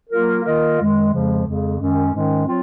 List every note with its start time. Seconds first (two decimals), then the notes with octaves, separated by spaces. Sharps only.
0.10 F#3 A#3 F4 A#4
0.44 D#3 A#3 F4 A#4 D#5
0.78 F#2 D#3 G#3
1.11 F2 C#3 F3 G#3
1.44 F2 C#3 G#3
1.78 F#2 D#3 G#3 C#4
2.11 G#2 D#3 G#3 C#4
2.46 F#3 C4 F4